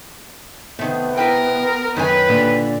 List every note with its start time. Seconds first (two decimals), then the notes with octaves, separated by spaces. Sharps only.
0.79 C3 D#3 A3 B3
1.17 E4 A#4 B4 G5
1.97 F#2 D#3 B4 C#5 G#5
2.28 A#2 D3 D5